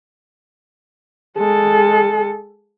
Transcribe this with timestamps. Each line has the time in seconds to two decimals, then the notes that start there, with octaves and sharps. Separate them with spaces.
1.38 G#3 A4